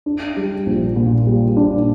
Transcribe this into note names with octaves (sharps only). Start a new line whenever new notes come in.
D4
G3
A#1
A#2
G3
D4